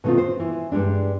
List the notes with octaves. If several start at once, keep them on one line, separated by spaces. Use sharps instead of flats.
B2 D#3 A3 A#3 C4 F4
C5
E3
G2 G3 G#3 D4